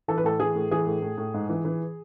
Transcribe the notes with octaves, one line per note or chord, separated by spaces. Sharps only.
E3 A4
B4
A2 A4
E3 G#4
A2
E3 G#4
A2
A2
A2
G#2
E3
E3